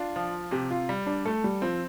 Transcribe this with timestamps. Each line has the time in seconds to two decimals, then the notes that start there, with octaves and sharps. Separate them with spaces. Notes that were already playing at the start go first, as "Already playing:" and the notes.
Already playing: D4 F4
0.16 F3
0.51 C3 G4
0.71 F4
0.89 G3
1.07 D4
1.26 A3 A4
1.44 G3
1.62 F3 C4